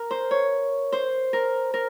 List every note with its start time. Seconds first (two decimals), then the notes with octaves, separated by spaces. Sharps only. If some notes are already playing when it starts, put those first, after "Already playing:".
Already playing: A#4
0.11 C5
0.31 C#5
0.92 C5
1.33 A#4
1.74 A#4